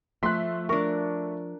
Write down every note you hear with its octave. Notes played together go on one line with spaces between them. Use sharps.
F3 A3 E5 C6 F#6 B6
D4 A#4 C#6